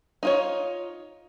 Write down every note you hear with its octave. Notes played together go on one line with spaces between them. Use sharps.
D#4 F4 C#5